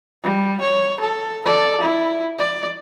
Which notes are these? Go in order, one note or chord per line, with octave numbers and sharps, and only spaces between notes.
G3
C#5
A4
A4 D5
E4
D5